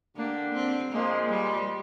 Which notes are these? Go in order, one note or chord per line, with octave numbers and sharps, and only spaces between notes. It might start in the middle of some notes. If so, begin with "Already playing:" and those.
D3 G3 A#3 D4
C4
A#2 F3 G#3 A#3
G3